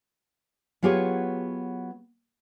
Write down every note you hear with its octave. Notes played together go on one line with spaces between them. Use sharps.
F#3 B3 F4 G4 G#4 C#5